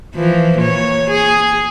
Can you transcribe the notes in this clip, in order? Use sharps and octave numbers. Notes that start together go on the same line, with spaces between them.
E3 F3
A#2 C#5
G#4